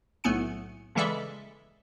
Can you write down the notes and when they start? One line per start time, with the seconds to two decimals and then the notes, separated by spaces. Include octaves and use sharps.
0.24 B1 A2 A3 B3 G#5 C#7
0.95 C#3 E3 G#3 A4 D5 E5